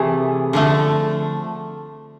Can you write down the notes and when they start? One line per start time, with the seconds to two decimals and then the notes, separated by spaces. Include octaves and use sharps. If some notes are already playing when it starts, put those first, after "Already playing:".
Already playing: C3 E3 A3 G#4
0.53 D3 F3 A3